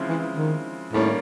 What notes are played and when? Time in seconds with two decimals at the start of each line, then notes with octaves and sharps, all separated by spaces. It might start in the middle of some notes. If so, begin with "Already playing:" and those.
Already playing: C#3 F3 G#3 C4 E4
0.08 E3
0.36 D#3
0.93 A2 D#3 G3 A#3 C#4